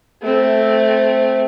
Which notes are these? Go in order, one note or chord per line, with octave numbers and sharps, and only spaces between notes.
A3 C4